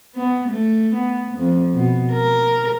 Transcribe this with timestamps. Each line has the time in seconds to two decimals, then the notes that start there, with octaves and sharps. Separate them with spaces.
0.16 B3
0.49 A3
0.94 B3
1.38 F2
1.74 B2
2.12 A#4